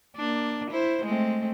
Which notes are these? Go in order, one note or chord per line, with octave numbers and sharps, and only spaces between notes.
A#3 D4
E4 C5
G#3 A3 C4